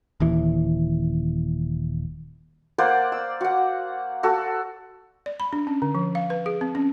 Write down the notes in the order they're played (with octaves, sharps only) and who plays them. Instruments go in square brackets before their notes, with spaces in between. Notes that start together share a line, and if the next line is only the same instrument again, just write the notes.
[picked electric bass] D#1 D#2 E3
[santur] A#3 C5 D5 F#5
E6
F#4 F#5
F#4 A4
[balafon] D5
B5
D4
C#4
D3
F3
F5
B4
G#4
C4
C#4